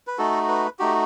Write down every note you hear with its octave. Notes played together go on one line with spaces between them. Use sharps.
B4
A3 D#4 F#4 A4
B4
A3 D#4 F#4 G4